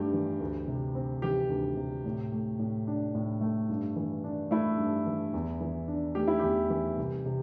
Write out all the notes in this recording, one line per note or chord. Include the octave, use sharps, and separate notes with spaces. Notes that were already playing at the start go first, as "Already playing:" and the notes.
Already playing: G2 A3 D4 G4
E3
D2
C3
C4
E3 G4
D2
C3
A2
A3
A2
D4
A2
A3
G2
E3
D4
A3 E4
G2
E3
E2
E3
D4
A3 G4
E4
E2 G4
E3
C2
C3